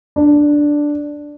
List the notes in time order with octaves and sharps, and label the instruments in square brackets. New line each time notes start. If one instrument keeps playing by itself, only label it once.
[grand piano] D4